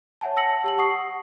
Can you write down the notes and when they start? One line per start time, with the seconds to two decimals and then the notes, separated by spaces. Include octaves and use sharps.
0.21 C#5 E5 F#5 G#5 A5
0.36 A5 E6 A#6 C#7 F#7
0.64 G4 A5 F#7
0.78 F#5 C#6 D#6 C7